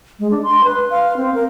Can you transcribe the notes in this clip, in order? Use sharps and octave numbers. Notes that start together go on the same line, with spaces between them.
G#3
D4
C6
B4
F5
C4
A#4